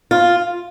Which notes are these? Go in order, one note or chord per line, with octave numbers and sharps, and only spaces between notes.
F4